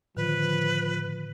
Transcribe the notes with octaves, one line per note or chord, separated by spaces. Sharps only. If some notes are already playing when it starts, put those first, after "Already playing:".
A2 D3 D#3 F3 B4